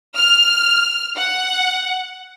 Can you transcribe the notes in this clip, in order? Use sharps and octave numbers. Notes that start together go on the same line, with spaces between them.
F6
F#5